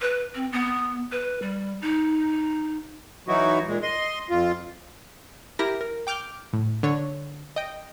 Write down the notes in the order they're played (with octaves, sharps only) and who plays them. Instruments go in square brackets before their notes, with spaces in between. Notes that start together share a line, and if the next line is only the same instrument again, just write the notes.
[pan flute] B4
C4
B3
B4
G3
D#4
[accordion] E3 F#3 D#4 E4 F#4
A#2 G#3
D#5 C6
F2 F4
[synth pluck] E4 G4 A#4 A#6
A#4
G5 D6 F6 G6
A2
D3 C#5
D#5 G5